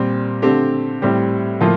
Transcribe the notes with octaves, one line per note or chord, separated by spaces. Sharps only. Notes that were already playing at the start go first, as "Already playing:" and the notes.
Already playing: A#2 G3 C4
D3 A3 C4 G4
A2 G3 C4 G4
A2 F3 A#3 F4